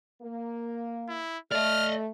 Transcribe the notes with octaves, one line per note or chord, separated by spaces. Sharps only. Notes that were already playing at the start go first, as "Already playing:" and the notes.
A#3
E4
A3 D5 D#5 F6